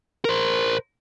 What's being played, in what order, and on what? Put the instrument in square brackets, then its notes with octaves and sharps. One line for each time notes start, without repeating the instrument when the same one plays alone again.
[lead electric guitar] A#4 C5